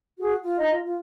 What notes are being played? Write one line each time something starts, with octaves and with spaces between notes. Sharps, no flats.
F#4 G#4
F4
D#4 D#5 A#5
F4
F4